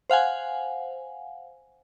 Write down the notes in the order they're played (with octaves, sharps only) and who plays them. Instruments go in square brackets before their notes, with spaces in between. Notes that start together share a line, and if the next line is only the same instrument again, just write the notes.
[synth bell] C5 F5 F#5 G#5